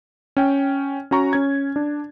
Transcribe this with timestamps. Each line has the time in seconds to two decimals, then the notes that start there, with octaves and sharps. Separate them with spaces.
0.37 C#4 G5
1.11 C#4 F#4 A#5 C#6
1.33 C#4 G#6
1.76 D4